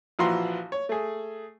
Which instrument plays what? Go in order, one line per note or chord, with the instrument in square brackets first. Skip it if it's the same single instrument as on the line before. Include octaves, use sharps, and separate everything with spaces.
[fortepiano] A#1 E3 F3 F#4 A#5 C6
C#5
A3 G#4